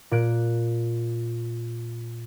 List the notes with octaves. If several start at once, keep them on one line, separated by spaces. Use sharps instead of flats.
A#2 F#6 D7